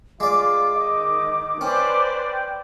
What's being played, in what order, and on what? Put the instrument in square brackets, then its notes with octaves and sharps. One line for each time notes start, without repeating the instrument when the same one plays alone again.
[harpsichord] G#3 D5 [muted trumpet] F4 [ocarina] D6
[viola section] D#3 [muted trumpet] D#5
[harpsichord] C#4 [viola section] B4 C5 D5 [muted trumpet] G5